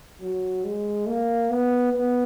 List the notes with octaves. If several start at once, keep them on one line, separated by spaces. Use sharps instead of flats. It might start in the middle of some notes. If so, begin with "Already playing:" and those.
F#3
G#3
A#3
B3
B3